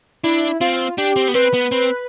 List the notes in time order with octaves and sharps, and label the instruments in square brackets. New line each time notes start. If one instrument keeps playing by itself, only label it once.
[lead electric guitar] D4 [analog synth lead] E4
[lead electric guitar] C4 [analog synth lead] F4
[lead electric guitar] D4 [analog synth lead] G4
[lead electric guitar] C4
B3
[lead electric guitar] C4 [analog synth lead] B4
[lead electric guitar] B3
C4